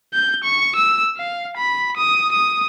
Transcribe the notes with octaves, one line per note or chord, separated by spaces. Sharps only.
G6
C#6
E6
F5
B5
D#6
D#6